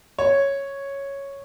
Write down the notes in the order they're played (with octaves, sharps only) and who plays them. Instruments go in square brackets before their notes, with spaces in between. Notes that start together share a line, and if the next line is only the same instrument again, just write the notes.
[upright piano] C#5